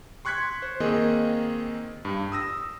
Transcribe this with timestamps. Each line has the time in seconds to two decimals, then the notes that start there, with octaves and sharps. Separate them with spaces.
0.25 C6 C#6 F#6 G#6 B6 C#7
0.62 C5
0.80 D#3 A#3 C4 G#4 D#5
2.05 G2
2.32 D#6 E6 A#6